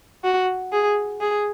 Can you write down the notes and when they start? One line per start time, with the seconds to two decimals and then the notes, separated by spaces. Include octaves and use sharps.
0.24 F#4
0.73 G#4
1.21 G#4